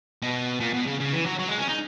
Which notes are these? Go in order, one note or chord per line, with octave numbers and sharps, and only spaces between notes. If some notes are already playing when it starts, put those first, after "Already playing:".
B2
A#2
B2
C#3
C#3
E3
F#3
F#3
G#3
C#4
D#4